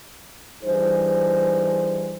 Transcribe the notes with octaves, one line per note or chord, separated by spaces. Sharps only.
G2 E3 D#4 G#4 C5